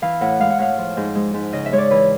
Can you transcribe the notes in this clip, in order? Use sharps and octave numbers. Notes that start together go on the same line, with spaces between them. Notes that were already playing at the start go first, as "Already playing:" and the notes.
E3 F5
A2 F#5
G#3 F5
F#5
A2 F5
F3
G#2
G#3
G#2
C#3 D#5
E5
G#3 C#5
D5
E3 B4